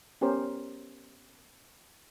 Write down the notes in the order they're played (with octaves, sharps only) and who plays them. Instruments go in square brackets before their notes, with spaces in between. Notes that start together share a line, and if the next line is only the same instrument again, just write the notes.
[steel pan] B3 C#4 G4 A#4 C5